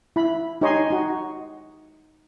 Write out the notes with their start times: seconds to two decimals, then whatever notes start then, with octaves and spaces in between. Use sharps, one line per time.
0.16 E4 B5
0.61 D#4 G4 C#5 D#5 G#5 C6
0.90 D#4 F#4